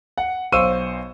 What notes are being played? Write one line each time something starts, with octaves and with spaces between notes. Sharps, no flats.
F#5
B1 C5 F5 C#6 E6 D#7